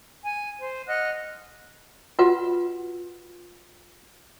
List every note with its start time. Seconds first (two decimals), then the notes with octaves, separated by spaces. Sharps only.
0.24 G#5
0.59 C5
0.87 D#5 F#5 F6 F#6
2.19 F4 F#4 B4 F#5